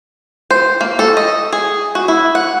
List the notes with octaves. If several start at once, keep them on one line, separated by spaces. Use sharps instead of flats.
C5
A#3
A4
D#5
G#4
F#4
E4
F#5